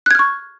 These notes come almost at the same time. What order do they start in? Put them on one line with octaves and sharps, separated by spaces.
F#6 G#6 F6 C#6